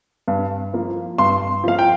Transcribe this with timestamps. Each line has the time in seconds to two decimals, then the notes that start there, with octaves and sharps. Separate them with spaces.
0.28 G2
0.74 F3 A#3
1.18 G2 C6
1.64 F3 A#3 F5
1.79 G5